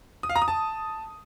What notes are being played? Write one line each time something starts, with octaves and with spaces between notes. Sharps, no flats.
D#6
F5
A#5
D#6
A5